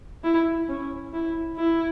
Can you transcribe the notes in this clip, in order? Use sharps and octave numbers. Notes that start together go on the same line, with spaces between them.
E4
C#4
E4
E4